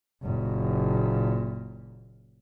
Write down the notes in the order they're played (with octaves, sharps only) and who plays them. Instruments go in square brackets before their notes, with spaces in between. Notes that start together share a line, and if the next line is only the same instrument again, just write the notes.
[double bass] F#1 A#2